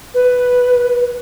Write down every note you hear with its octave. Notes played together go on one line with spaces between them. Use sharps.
B4